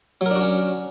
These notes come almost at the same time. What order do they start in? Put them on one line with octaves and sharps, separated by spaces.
F#3 A#4 D4 F#4 C#4